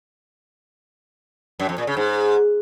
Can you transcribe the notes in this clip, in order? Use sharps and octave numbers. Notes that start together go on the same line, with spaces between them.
F#2
F2
A#2
C#3
G#2